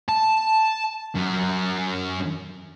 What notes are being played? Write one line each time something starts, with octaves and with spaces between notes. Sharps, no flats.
A5
F#2